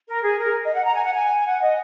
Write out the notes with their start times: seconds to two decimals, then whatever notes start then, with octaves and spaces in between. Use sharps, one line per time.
0.08 A#4
0.23 G#4
0.39 A#4
0.65 D#5
0.75 F#5
0.85 A#5
0.95 G#5
1.04 F#5
1.14 G#5
1.47 F#5
1.62 D#5